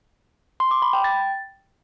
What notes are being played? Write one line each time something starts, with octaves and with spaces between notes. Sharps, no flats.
C6
D6
B5
G5
A6